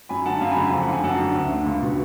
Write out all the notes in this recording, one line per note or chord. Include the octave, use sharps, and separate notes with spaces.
F#2 G#5 B5
D3 F#5 A5
F#2 F5 G#5
G#5 B5
C#3
G#5 B5
F2
F#5
D3 G#5
F#2 F#5 A5
D3
D2
D3
C#2
B2